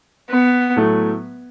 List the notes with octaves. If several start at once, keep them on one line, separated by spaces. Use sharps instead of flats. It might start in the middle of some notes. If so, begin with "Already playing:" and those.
B3
A2 F#3 A3